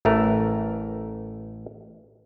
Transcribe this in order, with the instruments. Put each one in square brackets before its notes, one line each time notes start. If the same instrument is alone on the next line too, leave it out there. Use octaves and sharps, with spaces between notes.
[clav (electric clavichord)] A1 E3 A3 A#4